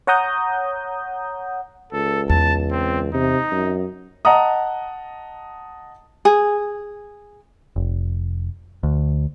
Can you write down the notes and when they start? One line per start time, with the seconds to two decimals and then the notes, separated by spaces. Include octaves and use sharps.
0.07 C#5 F#5 A#5 D#6 G6
1.93 C#2 A4
2.29 E2 A5
2.71 C4
3.14 C3 D#4
3.52 F#2
4.25 D#5 F#5 A5 A#5 D#6
6.25 G#4
7.76 F1
8.83 D2